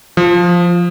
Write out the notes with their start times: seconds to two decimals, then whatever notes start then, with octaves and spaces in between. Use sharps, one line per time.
0.17 F3